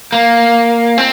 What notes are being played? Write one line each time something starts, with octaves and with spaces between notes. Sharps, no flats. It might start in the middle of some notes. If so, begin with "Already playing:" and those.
A#3
C4